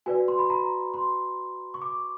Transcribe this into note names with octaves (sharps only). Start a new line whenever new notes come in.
F#4 B4 D5 G#5
C6
B5
A#5
C6
C#6
D6